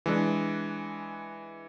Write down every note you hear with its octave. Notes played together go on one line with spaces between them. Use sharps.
E3 G#3 D4